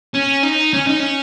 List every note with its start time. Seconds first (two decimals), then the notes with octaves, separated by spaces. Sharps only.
0.14 C#4
0.43 D#4
0.73 C#4
0.87 D#4
1.00 C#4